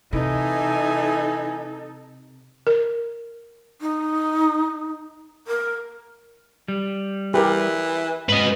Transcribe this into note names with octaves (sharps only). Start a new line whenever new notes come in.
C3 E3 D#4 E4 A4 G#5
A#4
D#4
A#4
G3
E3 G4 A#4
G#2 C#4 B4 D#5